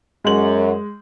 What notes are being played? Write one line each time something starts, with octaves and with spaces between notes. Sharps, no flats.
F#2 G#3 F#7